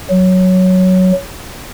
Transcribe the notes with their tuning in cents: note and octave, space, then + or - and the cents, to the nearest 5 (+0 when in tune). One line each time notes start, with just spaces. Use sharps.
F#3 +0